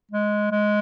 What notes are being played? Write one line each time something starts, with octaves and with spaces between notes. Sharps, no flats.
G#3
G#3